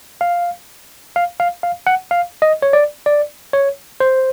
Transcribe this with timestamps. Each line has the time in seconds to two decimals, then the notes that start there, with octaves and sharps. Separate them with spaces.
0.21 F5
1.16 F5
1.40 F5
1.63 F5
1.87 F#5
2.11 F5
2.42 D#5
2.62 C#5
2.73 D5
3.06 D5
3.53 C#5
4.00 C5